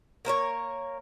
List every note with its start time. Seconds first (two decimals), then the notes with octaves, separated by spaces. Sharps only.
0.25 A#3 A#4 C5 C#5